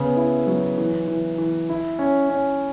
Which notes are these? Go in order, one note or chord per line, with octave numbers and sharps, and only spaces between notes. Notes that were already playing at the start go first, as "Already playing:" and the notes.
Already playing: C#3 B3
E4
F#3
E3
E3
E3
E4
C#4
C#4